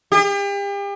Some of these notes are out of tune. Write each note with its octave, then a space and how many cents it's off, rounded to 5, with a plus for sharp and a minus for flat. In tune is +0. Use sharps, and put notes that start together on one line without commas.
G4 +40